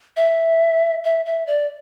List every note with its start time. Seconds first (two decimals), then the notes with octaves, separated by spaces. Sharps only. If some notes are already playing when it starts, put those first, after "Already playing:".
0.17 E5
1.04 E5
1.26 E5
1.47 D5